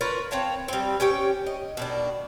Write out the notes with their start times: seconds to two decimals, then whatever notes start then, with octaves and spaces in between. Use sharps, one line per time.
0.01 F4 A#4 B4 C#5
0.31 C4 C#5 F5 A5
0.68 G3 C4
1.00 C#4 G4 C#5 G5
1.46 D#5
1.77 B2 D#3 D4